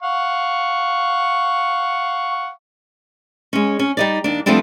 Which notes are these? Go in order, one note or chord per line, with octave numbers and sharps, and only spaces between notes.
F5 F#5 C#6
G#3 C#4
C#4
G3 D#4 D5
D#2 D4
F3 G3 A3 B3 C4 D4